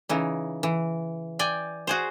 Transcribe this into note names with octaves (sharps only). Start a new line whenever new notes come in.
C#3 E3 D#4
E3
D5 G5 G#5
F#4 G#4 C5